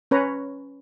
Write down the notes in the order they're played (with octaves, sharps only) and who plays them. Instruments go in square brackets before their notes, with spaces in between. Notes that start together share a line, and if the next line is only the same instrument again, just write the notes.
[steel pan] C#4 B4 C#5 A#5